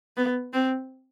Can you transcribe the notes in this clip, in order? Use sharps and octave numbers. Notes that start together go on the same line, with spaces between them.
B3
C4